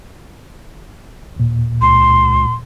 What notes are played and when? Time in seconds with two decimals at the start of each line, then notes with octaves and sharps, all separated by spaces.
1.36 D#2 A#2
1.82 C#2 C6